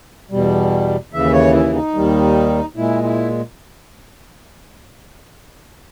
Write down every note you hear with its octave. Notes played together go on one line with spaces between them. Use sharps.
E2 B2 G3
D#2 C#3 E3 E5
C#5
E4
D#4
D#2 D#3 G3
A#2 G#3 E4
E4